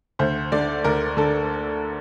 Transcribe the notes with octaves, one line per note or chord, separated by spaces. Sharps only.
D2 C5
D3 D5
D2 A#4
D3 A4